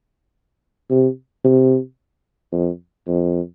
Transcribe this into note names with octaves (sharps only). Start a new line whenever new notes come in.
C3
C3
F2
F2